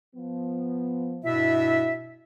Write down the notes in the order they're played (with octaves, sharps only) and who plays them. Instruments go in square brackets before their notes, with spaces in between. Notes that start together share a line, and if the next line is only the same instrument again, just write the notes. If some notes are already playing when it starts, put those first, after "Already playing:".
[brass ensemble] F3 B3
[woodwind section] G2 B2 E5 [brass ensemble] E4